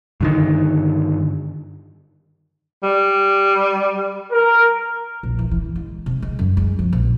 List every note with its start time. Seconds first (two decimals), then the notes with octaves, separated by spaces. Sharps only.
0.21 G2 D3 D#3
2.83 G3
4.31 A#4
5.23 A#1
5.39 E3
5.51 E3
5.76 G#3
6.06 C3
6.22 G#3
6.39 F#2
6.57 G#3
6.79 F2
6.93 A#1